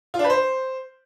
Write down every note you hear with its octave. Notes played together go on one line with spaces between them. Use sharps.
F4
D4
B4
C5